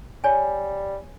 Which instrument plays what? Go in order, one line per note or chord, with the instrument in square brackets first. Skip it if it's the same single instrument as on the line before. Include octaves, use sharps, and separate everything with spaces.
[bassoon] G3 [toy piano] C#5 G#5